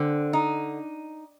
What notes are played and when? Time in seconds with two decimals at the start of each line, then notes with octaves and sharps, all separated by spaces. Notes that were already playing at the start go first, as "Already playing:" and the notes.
Already playing: D3 C4
0.33 D#4